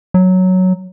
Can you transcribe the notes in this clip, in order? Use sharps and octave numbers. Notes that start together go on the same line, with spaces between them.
F#3